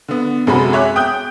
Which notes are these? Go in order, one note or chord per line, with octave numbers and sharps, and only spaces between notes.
D3 B3
F#2 C3 G#3 F#4 A4 B5
G#4 C#5 E5 D6 F#6
G5 D#6 F#6 G6